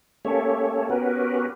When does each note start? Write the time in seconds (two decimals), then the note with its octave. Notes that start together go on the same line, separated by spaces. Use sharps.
0.25 A3 A#3 C#4 G4 A4 C#5
0.90 B3 C#4 F#4 G4 A#4 B4